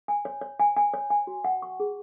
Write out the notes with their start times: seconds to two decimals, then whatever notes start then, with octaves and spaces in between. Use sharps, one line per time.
0.08 G#5
0.25 C#5
0.41 C#5
0.59 G#5
0.76 G#5
0.94 C#5
1.10 G#5
1.27 F#4
1.44 F#5
1.62 C#6
1.80 G#4